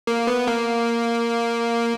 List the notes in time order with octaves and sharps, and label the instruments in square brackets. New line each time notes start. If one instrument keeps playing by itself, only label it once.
[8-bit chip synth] A#3
B3
A#3